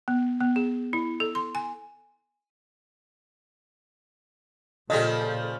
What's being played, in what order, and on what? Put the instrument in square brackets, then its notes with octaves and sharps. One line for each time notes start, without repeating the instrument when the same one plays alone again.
[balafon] B3
B3
G#4
E4
A4
C6
G#5
[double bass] A#2 [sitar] C#3 F3 G3 [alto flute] A4 [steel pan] D#5